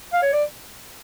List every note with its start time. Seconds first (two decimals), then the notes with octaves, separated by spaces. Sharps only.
0.13 F5
0.23 C#5
0.33 D5